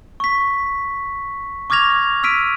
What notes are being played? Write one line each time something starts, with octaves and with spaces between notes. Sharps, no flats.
C#6 B6
C#6 D6 F6 G#6 A#6 F7
E6 F6 B6 D7 D#7